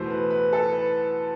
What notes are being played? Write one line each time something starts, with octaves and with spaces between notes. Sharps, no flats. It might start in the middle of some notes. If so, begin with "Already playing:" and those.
Already playing: E2 B2 A3 C5
B4
B4
A4
B4